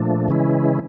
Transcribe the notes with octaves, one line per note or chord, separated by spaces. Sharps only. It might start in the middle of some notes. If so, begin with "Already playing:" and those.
Already playing: A#2 F3 A3 D4
C#3 E3 G#3 C#4 E4